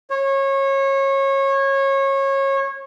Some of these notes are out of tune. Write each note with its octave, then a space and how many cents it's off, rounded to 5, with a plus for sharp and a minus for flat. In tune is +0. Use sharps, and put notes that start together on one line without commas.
C#5 -25